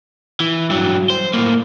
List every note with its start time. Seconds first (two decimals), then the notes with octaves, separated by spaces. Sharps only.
0.40 E3
0.70 G2 F#3
1.10 C5
1.34 A2 A#3